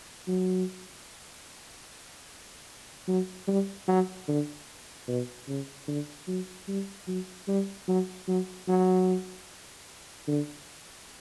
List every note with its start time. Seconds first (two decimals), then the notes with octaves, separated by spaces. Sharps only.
0.28 F#3
3.08 F#3
3.48 G3
3.88 F#3
4.28 D3
5.08 B2
5.48 C#3
5.88 D3
6.27 F#3
6.68 G3
7.07 F#3
7.48 G3
7.88 F#3
8.28 F#3
8.68 F#3
10.28 D3